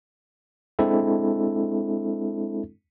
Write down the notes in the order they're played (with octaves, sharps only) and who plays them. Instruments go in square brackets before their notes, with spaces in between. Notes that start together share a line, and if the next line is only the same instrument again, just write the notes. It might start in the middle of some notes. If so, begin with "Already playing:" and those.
[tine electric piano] G#3 C4 D4 E4 A4